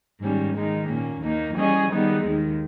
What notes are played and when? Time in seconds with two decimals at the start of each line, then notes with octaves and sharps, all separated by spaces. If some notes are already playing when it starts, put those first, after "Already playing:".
0.21 G#2 D#3 G3 A#3 C#4
0.54 D#3 G#3 D#4
0.88 A#2 A#3 C#4
1.22 D#2 D#3 A#3 D#4
1.55 E3 G3 C#4 G#4 D#5
1.89 D#3 G3 B3 D#4 G#4
2.24 D#2 D#3 G#3